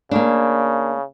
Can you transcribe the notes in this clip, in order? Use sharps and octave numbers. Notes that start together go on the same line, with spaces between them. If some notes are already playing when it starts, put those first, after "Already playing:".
C#3 A#3 D4